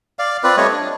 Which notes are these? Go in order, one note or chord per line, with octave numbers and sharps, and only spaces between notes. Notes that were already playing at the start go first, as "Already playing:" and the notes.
D5 F5
C4 F4 B4 D5
G3 A3 C#5 D#5
D4